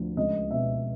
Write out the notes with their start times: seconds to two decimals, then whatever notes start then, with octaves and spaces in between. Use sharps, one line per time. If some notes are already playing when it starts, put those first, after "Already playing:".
Already playing: D2 F3
0.17 C#2 D#5
0.51 B2 E5